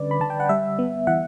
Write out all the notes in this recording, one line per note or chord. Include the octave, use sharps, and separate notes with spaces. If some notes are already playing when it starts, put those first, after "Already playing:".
Already playing: D3 G3 C#4 B4 D5
B5
D3 A5
G5
F#5
G3 E5
B3
E3 F#5